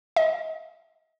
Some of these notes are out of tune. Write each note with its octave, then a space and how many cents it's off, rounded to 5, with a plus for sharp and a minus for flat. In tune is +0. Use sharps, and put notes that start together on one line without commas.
D#5 +40